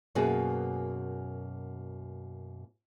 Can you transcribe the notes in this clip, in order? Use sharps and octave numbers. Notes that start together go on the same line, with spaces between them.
F#2 B2 A#3 F#4 G#4 B4